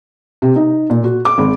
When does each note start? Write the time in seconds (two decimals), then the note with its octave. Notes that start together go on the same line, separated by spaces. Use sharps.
0.42 C3
0.56 D#4
0.90 A#2
1.04 F#4
1.25 D6
1.38 G#1